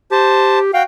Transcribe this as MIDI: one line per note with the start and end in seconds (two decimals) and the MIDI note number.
0.11 0.71 67
0.11 0.59 72
0.11 0.59 81
0.74 0.83 66
0.74 0.82 77
0.74 0.83 79